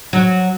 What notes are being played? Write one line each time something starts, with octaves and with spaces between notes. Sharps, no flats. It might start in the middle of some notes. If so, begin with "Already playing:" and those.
F#3